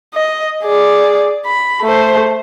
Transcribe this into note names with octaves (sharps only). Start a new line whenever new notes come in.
D#5
G#4 D5
B5
A3 C5